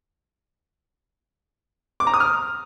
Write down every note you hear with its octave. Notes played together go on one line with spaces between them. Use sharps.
D6
A#5
D#6
F6